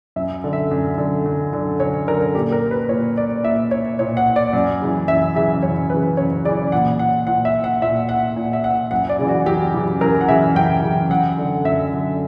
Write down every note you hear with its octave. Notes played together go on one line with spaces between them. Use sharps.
F#2 E5
D3
E5
F#2
D3
F#2
D3
F#2 C#5
D3 A#4
A#2 G4
A#4
B4
A#2 C#5
D5
A#2 E5
C#5
A#2 C#5
F#5
D5
F#2
C#3 E3
F#2 E5
C#3 E3 E5
F#2 C#5
C#3 E3 B4
F#2 C#5
C#3 E3 D5
A#2 F#5
F#5
A#2 F#5
E5
F#5
A#2 E5
F#5
A#2
E5
F#5
F#2 F#5
D5
C#3 E3
F#4
F#2 G4
C#3 E3 G4
F#2 A#4
F#5
C#3 E3 E5
F#2 G5
C#3 E3
F#2 F#5
D3
F#2 E5
D3